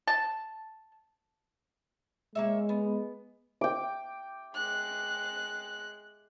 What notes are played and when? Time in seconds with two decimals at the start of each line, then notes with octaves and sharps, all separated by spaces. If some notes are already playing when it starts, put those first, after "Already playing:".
0.07 A5
2.35 G#3 A#3 C#5 E5
2.69 B3
3.61 G5 D6
4.54 G#3 F#6